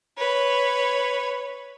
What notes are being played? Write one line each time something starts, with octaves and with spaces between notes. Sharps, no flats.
B4 C#5